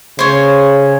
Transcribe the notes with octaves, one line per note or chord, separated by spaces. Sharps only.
C#3 C5 C#5